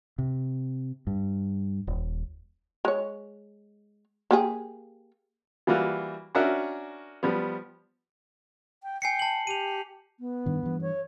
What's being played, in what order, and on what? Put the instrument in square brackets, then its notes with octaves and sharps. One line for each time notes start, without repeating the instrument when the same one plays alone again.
[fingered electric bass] C3
G2
D#1
[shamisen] G#3 C#5
A#3 G4 G#4
[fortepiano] E3 G3 A#3 F4 F#4
C#4 D4 F#4 A#4 E5
F3 G3 B3
[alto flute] G5
[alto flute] G5 [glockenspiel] G#5 C7 C#7
[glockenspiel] A5 F#7
[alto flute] G4 [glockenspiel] D#7 F7
[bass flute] B3
[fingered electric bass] G2 D#3 D4
G2 E3
[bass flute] C#5